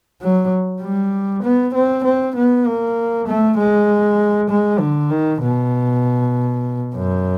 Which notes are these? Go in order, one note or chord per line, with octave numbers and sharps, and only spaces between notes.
F#3
G3
B3
C4
C4
B3
A#3
A3
G#3
G#3
D3
D#3
B2
F#2